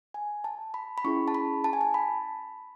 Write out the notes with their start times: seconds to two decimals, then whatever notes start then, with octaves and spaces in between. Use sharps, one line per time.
0.14 G#5
0.44 A5
0.74 B5
0.98 B5
1.04 C#4 E4 G#4 C#6
1.28 A5
1.35 B5
1.64 A5
1.73 G#5
1.81 A5
1.94 B5